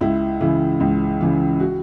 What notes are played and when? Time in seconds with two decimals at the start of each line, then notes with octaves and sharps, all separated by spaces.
0.01 C#2 E4
0.41 C#3 E3 E4
0.80 C#2
1.21 C#3 E3
1.60 F#4